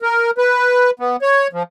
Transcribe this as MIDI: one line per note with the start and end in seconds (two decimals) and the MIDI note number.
0.02 0.31 70
0.38 0.91 71
1.00 1.16 59
1.22 1.47 73
1.53 1.63 53